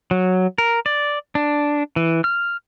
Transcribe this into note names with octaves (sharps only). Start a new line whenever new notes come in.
F#3
A#4
D5
D4
E3
F6